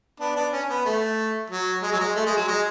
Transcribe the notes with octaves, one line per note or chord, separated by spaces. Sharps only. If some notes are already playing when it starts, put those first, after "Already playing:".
B3 D4
B3 D4
C#4
B3
A3
F#3
G#3
F#3
G#3
A3
G#3
F#3
G#3